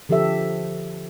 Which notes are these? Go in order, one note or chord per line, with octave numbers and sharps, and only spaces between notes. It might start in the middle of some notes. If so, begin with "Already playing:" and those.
D3 F3 G4 A4 E5